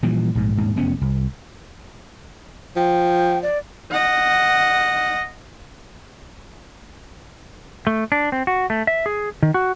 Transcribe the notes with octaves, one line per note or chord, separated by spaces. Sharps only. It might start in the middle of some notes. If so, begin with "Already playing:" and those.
A#2 E3 F3 G3
A#1 G#2
D#1 G#2
F1 E2 B3 C#4
C2
F3 G5
D5
D#5 F#5
A3
D4
C4
F#4
A3
E5
G#4
D#3
F#4